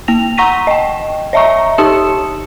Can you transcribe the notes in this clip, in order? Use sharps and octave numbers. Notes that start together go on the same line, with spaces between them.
A#3 A#6 F7
F#5 A#5 C#6 A#6 B6 D#7
D#5 G5
C#5 D#5 E5 A#5 C#6
D#4 G4 A5 D#6 C#7 E7